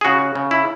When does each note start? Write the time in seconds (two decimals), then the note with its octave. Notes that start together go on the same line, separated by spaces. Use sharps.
0.01 G#4
0.05 C#3 F#4
0.35 C#3
0.51 E4